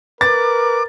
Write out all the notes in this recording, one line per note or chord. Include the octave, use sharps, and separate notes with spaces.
A#4 B4 D6 A6